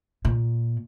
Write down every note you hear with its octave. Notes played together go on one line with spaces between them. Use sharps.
A#2